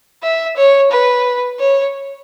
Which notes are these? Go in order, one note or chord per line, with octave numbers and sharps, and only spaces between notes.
E5
C#5
B4
C#5